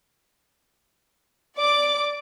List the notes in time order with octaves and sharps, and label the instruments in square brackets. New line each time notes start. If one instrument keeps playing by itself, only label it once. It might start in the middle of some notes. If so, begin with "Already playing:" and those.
[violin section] D5 D6